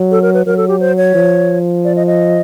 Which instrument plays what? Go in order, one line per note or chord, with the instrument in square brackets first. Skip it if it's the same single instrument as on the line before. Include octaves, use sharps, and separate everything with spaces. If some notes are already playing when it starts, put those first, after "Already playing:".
Already playing: [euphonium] F#3
[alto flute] A4
A#4
B4
[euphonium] F#3 [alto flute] A#4
[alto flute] A4
G4
C5
C#5
[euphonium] F3
[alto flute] D5
D#5
D#5